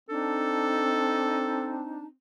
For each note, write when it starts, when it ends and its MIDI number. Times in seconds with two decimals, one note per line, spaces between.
0.09 2.14 60
0.09 2.05 62
0.09 2.05 63
0.09 1.74 69
0.09 2.05 81